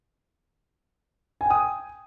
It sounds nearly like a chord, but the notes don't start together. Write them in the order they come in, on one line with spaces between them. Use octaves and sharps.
G#5 G5 D#6